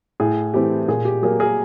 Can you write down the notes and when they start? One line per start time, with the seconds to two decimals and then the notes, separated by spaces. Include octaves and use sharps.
0.20 A2 G#4
0.54 E3 A3 C4 G4
0.88 A#2 G#4
1.05 G4
1.23 F#3 A#3 G#4
1.39 G#4 A#4